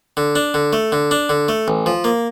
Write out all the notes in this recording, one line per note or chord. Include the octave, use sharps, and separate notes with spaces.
D3
D4
D3
A3
D3
D4
D3
A3
A1
F3
A#3